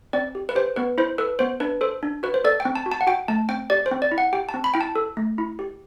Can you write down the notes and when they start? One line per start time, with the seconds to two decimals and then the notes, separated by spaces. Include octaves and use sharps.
0.13 C4 D5
0.35 G4
0.49 B4
0.55 G4 C5
0.76 B3 B4
0.98 E4 C5
1.18 A4 B4
1.39 B3 C5
1.60 D4 B4
1.81 A4 C5
2.03 D4
2.23 F#4 B4
2.34 C5
2.44 A4 D5
2.60 G5
2.65 C4
2.75 A5
2.86 F#4
2.92 A5
3.01 F#5
3.07 F#4 G5
3.28 A3 A5
3.49 C4 G5
3.70 G4 D5
3.86 C5
3.91 C4
4.02 D5
4.12 E4
4.18 F#5
4.33 G4 G5
4.49 A5
4.54 C4
4.64 B5
4.74 E4 G5
4.81 A5
4.96 A4
5.17 A3
5.38 E4
5.59 G4